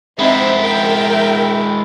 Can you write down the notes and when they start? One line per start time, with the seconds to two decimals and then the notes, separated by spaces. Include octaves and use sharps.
0.19 G#3 C4 D#4 E4 E5
0.60 A#4 E5 G5